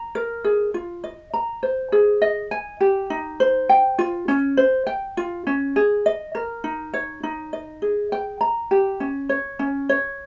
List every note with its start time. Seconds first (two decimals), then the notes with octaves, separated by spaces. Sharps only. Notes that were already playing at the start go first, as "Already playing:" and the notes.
Already playing: A#5
0.15 A#4
0.44 G#4
0.74 F4
1.04 D#5
1.34 A#5
1.63 C5
1.92 G#4
2.22 D#5
2.51 G#5
2.81 G4
3.10 D#4
3.40 C5
3.69 G5
3.99 F4
4.28 C#4
4.57 C5
4.87 G5
5.17 F4
5.47 C#4
5.76 G#4
6.06 D#5
6.35 A#4
6.64 D#4
6.94 C#5
7.23 D#4
7.53 D#5
7.82 G#4
8.12 G5
8.41 A#5
8.71 G4
9.00 C#4
9.29 C#5
9.59 C#4
9.89 C#5